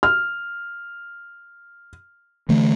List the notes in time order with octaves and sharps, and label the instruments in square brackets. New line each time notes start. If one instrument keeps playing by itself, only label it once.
[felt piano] F6
[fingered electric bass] D3 E3 A3